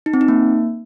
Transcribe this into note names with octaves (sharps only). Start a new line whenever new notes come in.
D#4
C4
D#4
A#3